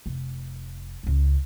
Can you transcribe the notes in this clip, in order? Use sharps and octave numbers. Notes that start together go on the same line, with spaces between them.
F1
C#2 C#3